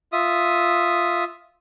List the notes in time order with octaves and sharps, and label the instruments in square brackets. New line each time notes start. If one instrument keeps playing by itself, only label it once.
[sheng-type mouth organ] F4 E5 D#6